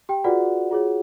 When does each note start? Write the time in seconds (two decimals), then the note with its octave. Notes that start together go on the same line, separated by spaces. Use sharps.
0.09 G4 G5
0.24 F4 F#4 G#4 B4 D5 F#5
0.71 F4 G#4 C#5